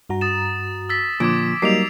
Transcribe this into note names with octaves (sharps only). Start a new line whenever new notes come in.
G2 F#4 A#5
D#6 A6 E7
E6 A6 B6
A#2 D3 F3 D6 G#6 D7
F#3 G3 A#3 D#4 C7 D7 F7